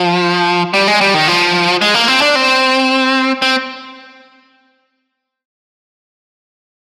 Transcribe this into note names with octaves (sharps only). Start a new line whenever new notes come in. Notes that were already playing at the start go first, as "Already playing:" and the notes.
Already playing: F3
G3
G#3
G3
D#3
F3
G#3
A#3
C4
D4
C4
C4